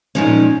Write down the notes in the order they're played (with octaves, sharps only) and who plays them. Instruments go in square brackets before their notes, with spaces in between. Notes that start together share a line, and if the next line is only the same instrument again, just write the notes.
[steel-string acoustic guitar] A#2 F3 G#3 C#4 D#4